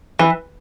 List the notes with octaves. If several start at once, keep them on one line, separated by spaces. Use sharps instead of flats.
E3